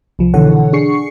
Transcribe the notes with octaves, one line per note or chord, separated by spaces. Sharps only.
C2 F3
B2 D3 E3 A4 C#5 F#5
D4 G#4 C#6 C7 C#7